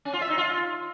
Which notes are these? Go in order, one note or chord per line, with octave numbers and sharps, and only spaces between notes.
C#4
F4
E5
D#4
F4